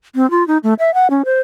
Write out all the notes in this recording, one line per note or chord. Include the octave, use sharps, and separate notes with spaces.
C4
F4
D#4
A3
E5
F#5
C#4
C5